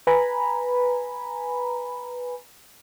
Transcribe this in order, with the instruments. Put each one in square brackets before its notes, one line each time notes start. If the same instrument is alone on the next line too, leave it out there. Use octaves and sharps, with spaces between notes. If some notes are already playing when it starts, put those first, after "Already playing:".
[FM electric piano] B4 G#5 A#5 B5